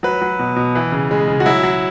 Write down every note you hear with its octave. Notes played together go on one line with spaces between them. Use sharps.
F#3 B4
F#3
B2
B2
E3
C#3
G#3
C#3
F#4
F#3 E4
F#3